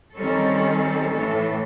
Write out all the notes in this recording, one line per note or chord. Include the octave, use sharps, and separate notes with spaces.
D#3 G3 C4 C#4 A4
A2 E3 A3 A4